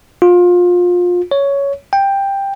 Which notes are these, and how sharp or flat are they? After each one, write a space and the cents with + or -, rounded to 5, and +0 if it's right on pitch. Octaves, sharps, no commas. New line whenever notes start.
F4 +25
C#5 +10
G5 +10